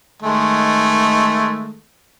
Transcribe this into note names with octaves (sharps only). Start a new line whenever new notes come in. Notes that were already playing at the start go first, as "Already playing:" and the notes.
D#3 G#3 A3